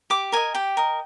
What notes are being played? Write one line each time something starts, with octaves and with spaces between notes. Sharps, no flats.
G4 D6
A#4 D#5 G#5
G4 G5
A#4 D#5